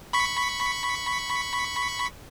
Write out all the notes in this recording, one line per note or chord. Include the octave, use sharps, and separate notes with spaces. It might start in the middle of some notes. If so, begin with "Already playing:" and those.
B5 C#6 B6